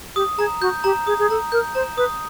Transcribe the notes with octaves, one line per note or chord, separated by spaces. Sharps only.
G4 D#6
G#4 A#5
F#4 G6
G4 A#5
G#4 D#6
G#4
A4 A#5
A#4 G6
C5 A#5
B4 D#6